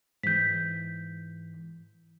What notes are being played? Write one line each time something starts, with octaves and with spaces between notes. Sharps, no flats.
G#2 E3 G6 B6